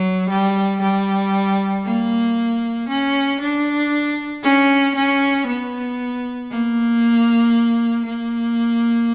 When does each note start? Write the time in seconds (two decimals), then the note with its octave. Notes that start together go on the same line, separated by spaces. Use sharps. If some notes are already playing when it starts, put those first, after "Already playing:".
Already playing: F#3
0.29 G3
0.81 G3
1.84 A#3
2.89 C#4
3.40 D4
4.43 C#4
4.96 C#4
5.47 B3
6.50 A#3
8.05 A#3